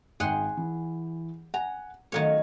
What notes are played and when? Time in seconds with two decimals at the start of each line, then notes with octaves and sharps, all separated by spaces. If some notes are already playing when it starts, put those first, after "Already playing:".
0.20 G#1 G#4 F#5 G5 C6
0.57 E3
1.54 F#5 G#5 A#5
2.12 D#3 F#3 A3 C#5 F5 G#6